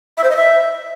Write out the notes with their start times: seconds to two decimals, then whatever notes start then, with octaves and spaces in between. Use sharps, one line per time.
0.17 E5
0.24 C5
0.30 D#5
0.36 E5